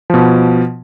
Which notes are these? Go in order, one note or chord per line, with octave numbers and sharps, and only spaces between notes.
B2 F3